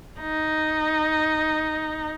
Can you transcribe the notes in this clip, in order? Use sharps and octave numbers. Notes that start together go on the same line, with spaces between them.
D#4